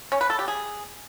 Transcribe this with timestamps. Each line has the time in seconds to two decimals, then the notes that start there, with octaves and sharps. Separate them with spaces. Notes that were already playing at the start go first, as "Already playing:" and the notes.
0.12 C#4
0.21 B4
0.30 A4
0.39 G4
0.48 G#4